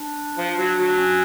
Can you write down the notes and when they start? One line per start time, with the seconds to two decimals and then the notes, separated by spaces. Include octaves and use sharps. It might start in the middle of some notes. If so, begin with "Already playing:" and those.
Already playing: D4
0.38 F3
0.58 F#3
0.78 F#3
0.98 C#4